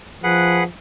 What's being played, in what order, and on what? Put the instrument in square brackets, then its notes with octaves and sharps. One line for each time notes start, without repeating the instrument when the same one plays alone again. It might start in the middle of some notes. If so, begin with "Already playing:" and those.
[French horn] F3 [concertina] G#4 B4 F#5